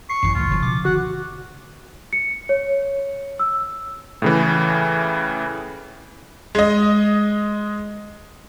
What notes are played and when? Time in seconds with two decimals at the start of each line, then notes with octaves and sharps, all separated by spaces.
0.10 C#6 C7
0.23 G#1 F#2 E3
0.35 C#2 A2 E3 F4
0.50 F#1 C#3 E3 F3
0.63 B2 D6
0.85 D3 F#4 F#5
2.13 C#7
2.49 C#5
3.40 E6
4.22 A2 C#3 E3
6.55 G#3 D#5